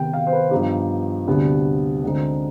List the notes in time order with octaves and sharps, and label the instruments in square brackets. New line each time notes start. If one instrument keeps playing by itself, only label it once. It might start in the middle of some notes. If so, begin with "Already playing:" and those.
Already playing: [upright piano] C3 D#3 B3 G5
F5
C5
B4
G2 F3 B3 D#4 G4
D2 C3 G3 B3 D4
D2 D3 G#3 C4 D#4